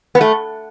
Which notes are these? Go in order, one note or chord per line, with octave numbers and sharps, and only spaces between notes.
B3
A3